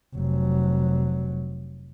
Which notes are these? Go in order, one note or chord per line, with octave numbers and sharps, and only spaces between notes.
F1 F#3